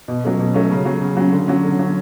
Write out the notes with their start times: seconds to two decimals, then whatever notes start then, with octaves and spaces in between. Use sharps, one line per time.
0.08 B2
0.24 F#3 A3 C#4
0.39 B2
0.54 F#3 A3 C#4
0.71 C#3
0.85 F#3 C#4
1.01 C#3
1.17 F#3 C#4
1.32 D3
1.48 F#3 C#4
1.64 D3
1.79 F#3 C#4